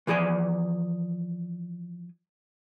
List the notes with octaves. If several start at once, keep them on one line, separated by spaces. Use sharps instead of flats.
E3 F3 G#4 D5 G#5